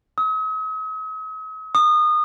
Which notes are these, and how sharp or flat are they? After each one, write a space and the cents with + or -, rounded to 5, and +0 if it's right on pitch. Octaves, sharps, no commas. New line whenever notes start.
D#6 +45
D#6 -25